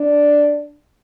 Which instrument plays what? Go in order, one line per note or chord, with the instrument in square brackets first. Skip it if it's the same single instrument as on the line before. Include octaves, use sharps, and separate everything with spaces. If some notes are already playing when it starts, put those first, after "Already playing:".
Already playing: [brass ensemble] D4